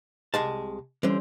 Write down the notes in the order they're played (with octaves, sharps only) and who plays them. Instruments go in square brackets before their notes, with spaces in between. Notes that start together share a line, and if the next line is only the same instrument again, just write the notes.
[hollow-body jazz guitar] C2 G#3 A5
[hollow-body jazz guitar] D3 E3 [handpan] G3 C#4 C5